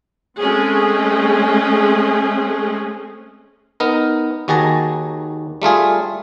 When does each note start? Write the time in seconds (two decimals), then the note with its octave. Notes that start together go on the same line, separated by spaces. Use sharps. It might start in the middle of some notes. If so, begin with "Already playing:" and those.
0.38 G#3 A3 C4 C#4 G#4
3.80 B3 D#4 A#4
4.48 D#2 D#3 F#4 G#4 A5 A#5
5.62 G3 A3 F4 G#4